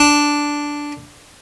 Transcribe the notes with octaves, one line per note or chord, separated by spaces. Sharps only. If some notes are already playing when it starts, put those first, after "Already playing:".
Already playing: D4